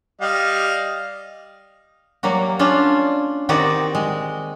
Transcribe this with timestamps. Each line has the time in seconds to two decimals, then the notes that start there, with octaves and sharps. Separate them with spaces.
0.21 G3 D#5 F5
2.23 F#3 G3 A#3 F#4
2.59 C#4 D4 F4
3.49 D#3 C4 F#4 G4 D5 D#5
3.95 G#3